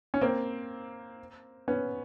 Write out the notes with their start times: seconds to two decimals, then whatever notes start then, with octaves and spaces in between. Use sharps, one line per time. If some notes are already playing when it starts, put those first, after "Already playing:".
0.14 C#4
0.21 A#3 C4
1.68 B3 C#4